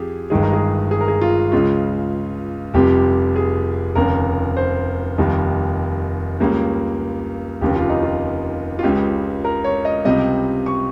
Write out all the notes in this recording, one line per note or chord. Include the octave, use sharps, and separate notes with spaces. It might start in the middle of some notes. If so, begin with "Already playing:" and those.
Already playing: F2 G4 G#4
G1 G2 D#3 G#3 G#4
A#4
G#4
G#4
A#4
G#4
F4
C#2 C#3 G#3 F4
F1 F2 C3 G3 G4
G#4
F1 D#2 C#3 A#4
C5
F1 D#2 D#3 G3
C#2 C#3 G3 A#3
F1 D#2 C#3 G4
F4
D#4
F4
F4
C#2 C#3 G#3 G4
A#4
C#5
D#5
C#2 C3 G3 D#5
C#6